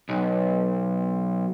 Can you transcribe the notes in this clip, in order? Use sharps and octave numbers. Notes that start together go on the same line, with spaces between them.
B1